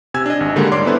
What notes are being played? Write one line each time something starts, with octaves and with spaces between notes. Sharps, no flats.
C3 G#5 E6 G#6
D4 D#5
G#1
D3 D#3 G3 G#3 A#3 D#4
D4 C#5 D5 C6 D6
B3 C#4 E4 A4 B4 C5